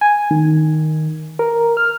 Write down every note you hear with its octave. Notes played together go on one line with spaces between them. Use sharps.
G#5
D#3
A#4
F6